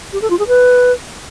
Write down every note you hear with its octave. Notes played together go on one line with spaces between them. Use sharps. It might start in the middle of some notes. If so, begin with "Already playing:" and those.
G4
A4
F4
G#4
B4